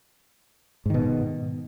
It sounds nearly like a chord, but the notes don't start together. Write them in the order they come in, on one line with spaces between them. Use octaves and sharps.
G#2 D#3 B2